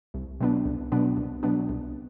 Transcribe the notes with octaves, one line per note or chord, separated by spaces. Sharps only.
C2
B2 F#3 B3 D4
C2
B2 F#3 B3 D4
C2
B2 F#3 B3 D4
C2